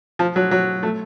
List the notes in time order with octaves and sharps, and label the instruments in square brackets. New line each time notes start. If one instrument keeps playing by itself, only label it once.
[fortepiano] F3
F#3
F#3
A3